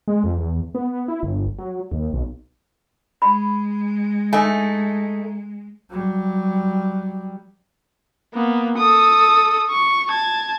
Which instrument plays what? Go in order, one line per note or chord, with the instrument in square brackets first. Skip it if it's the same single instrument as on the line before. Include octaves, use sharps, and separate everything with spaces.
[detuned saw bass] G#3
F2
E2
B3
E4
G1
F#3
D#2
B1
[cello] G#3 [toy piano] B5
[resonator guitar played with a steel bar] A3 D#4 [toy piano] G#5
[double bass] F#3 G3
[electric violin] A#3 B3
A4 D#6
C#6
A5 G#6